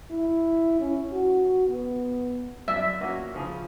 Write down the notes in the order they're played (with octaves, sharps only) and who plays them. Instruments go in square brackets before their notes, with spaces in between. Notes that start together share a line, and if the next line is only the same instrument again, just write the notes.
[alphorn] E4
C#4
F#4
B3
[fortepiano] F#2 D5 [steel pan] E5
[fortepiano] A#3 C#4 F#4
C#3 F3 G#4